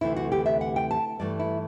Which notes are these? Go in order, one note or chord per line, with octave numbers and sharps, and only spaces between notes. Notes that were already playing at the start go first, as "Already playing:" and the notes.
D2 C3 E3 A3 E4
F#4
G4
E5
F#5
G5
A5
G2 E3 A3 D5
E4